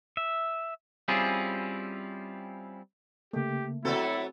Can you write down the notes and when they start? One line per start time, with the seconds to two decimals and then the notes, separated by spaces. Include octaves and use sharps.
0.17 E5
1.08 G3 C4 C#4 E4 F4 G#4
3.33 C#3 A3 A#3 G4
3.85 F#3 B3 C4 E4 F#4 A4